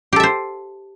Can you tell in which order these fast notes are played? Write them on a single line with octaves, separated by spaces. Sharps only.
G4 A4 E5 C5